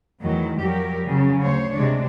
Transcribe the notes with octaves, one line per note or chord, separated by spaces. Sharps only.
E2 A2 D#3 E3 F#3
F2 F#3 G3 G4 A#4
C#3 F#3
D2 C5 C#5
C3 G#3 D4